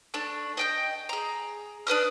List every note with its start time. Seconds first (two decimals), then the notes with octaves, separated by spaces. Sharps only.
0.14 A3 D4
0.57 D#5 G5 G6
1.09 G#4 A#5
1.87 D4 B4 D#6 F6